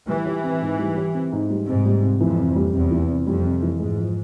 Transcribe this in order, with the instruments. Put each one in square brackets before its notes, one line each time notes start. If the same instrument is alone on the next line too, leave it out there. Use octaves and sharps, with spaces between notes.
[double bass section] E3 [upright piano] G3
[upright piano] G4
C4
G#2
G3
G4
C4
G#2
G3
[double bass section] G#2 [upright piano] C3
[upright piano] G3
C3
[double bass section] F2 [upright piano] E3
[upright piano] C3
G3
[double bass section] E2 [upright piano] C3
[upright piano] E3
C3
[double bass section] F2 [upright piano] G3
[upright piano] C3
E3
[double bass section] G#2 [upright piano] G#3
[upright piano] F3